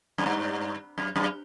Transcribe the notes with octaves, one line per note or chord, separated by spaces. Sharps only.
F#2
G2
F#2
F#2